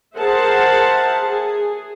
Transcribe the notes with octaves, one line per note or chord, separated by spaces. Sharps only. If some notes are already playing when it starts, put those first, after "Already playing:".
G#4 A#4 C5 E5 F#5 A5
G#4